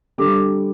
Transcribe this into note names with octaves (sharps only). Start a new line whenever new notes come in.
D3 G3 D6